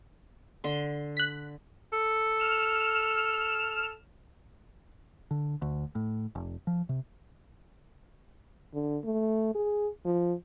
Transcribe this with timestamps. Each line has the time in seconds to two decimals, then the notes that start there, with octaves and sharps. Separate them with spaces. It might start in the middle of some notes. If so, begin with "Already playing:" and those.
0.64 D3 C6
1.17 F#6 B6
1.93 A4
2.40 F6 E7
5.31 D3
5.62 D2
5.95 A2
6.35 F1
6.67 F3
6.89 C3
8.74 D3
9.04 A3
9.55 G#4
10.05 F3